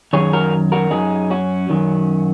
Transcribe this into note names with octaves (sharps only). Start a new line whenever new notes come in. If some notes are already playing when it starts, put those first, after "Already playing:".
F#2 D#3 F#3 G#4 C#5
F#4 A#4
F#4 A#4
F#2 F#3 D#4 G#4
C#4 F#4
F#2 D#3 F#3